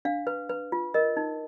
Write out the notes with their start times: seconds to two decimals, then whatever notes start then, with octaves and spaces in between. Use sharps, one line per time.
0.05 D4 F5
0.27 B4
0.49 B4
0.72 F4
0.94 A#4 D#5
1.17 D#4